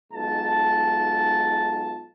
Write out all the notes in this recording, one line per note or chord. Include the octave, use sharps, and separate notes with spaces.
B1 G#2 F4 A5